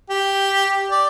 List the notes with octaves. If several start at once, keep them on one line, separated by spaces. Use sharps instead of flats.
G4
D5